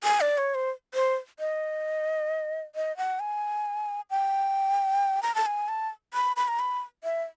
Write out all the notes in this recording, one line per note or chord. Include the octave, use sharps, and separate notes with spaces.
G#5
D5
C#5
C5
C5
D#5
D#5
F#5
G#5
G5
A#5
A5
G#5
A5
B5
B5
A#5
B5
E5